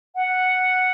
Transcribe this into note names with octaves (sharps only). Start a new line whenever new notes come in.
F#5